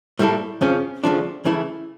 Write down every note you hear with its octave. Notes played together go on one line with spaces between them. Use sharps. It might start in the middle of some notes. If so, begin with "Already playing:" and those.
A2 G3 A#3 E4 A4
F2 C#3 F3 C#4
D2 C#3 F3 A3 D4
C#3 E3 A3 E4